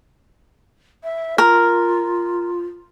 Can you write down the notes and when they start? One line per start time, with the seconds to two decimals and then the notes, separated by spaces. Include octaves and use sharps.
1.03 E5
1.38 F4 A#4